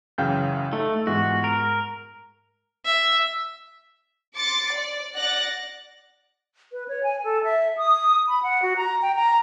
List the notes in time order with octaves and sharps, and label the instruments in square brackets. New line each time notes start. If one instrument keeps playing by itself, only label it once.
[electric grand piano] F#2 C#3 E3 [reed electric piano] F5 G5 G6
[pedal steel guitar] A3 [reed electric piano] D#4 [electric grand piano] A4
[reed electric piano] G#2 G#3 [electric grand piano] E3 B3 F4 [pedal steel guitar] F#4
[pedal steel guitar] A#4 [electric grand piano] D7
[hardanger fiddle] E5
[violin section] C6 D6 A6 C#7
D5
D5 F#5 F#6 A6 A#6
[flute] B4
C#5
G#5
A4
E5
D#6
B5
F#5
F#4
A#5
G5
A#5